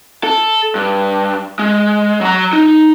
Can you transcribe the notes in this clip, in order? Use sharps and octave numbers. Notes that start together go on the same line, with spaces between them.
A4
G2
G#3
F#3 A#5
D#4